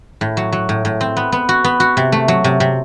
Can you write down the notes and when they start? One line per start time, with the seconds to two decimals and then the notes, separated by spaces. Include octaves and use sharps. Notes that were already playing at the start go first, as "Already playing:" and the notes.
0.21 A2
0.37 F#3
0.52 F#3
0.69 A2
0.85 A2
1.01 C4
1.17 B3
1.32 B3
1.49 F#4
1.64 B3
1.80 F#4
1.97 C3
2.12 A3
2.28 F#3
2.44 C3
2.60 C3